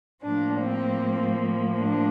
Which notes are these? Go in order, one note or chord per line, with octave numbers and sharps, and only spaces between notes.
A2 F3 A#3 D4
C4
D4